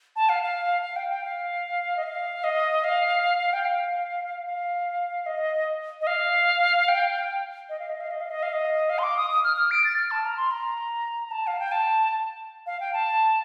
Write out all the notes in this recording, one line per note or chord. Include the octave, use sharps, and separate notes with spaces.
A5
F5
F5
F5
G5
G5
F5
D#5
F5
D#5
F5
G5
F5
F5
D#5
D#5
F5
G5
D#5
F5
D#5
F5
D#5
F5
D#5
F5
D#5
F5
C6
D6
D#6
D#6
F6
F6
D7
A6
F6
A5
A#5
C6
A#5
A#5
A5
F5
G5
A5
F5
G5
A5